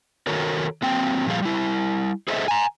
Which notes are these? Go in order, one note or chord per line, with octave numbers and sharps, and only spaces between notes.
D#3 F#4 A4 A#4 C#5
F#3 A#3 C4 G5
A#2 F3 G3 G#4 F5
G3 E4
G#4 A4 C5 D#5 E5
G#5 A#5